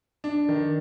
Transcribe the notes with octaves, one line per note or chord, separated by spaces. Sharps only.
D4
D#3